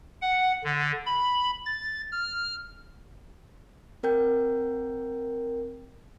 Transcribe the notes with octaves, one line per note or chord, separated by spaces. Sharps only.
F#5
D3
B5
A6
F6
C4 A#4 G5 G6